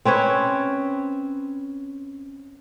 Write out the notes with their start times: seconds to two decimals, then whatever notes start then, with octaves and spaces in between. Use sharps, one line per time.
0.05 C4 C#4 B4 C#5